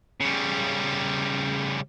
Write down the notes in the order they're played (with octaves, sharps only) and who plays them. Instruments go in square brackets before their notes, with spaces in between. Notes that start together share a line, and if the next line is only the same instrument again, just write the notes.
[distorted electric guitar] C#3 G3